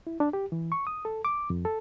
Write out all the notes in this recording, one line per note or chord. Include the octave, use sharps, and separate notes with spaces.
E4
D4
G4
E3
C#6
D#6
A4
D6
F2
A4